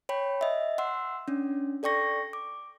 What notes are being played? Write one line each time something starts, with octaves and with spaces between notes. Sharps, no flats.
C#5 G5 B5
D#5 E5
F#5 C6 E6
C#4 D4
A4 D5 G5 C#6 A#6
D6